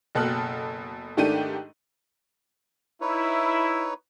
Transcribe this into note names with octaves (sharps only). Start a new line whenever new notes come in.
F#1 B2 A4 F6 F#6
G#2 D#3 A3 D4 G4 D#7
D#4 E4 B4 C#5